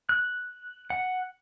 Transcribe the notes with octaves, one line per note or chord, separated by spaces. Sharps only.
F#6
F#5